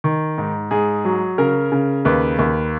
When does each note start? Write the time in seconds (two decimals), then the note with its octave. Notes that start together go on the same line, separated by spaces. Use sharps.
0.04 D#3
0.38 G#2
0.71 G#2 G#4
1.05 F#3
1.38 C#3 A#4
1.72 C#3
2.05 D#2 B4
2.39 D#2